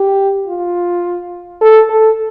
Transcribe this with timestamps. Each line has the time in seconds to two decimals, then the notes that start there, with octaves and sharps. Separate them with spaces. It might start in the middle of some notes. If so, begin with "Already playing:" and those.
Already playing: G4
0.47 F4
1.61 A4
1.90 A4